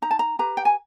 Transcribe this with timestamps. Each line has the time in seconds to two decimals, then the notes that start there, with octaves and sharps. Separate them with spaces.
0.02 D#4 A#5
0.11 A5
0.19 A#5
0.39 G4 B4 A#5
0.57 G5
0.65 G#5